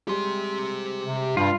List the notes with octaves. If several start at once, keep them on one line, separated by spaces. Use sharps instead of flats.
G3 G#3 G4 C6
C3
G2 G3 F4